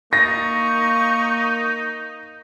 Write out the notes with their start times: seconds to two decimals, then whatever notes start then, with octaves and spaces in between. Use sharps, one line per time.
0.13 A#3 D#4 C#6 A#6